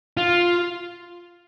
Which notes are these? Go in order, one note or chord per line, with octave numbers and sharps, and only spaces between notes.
F4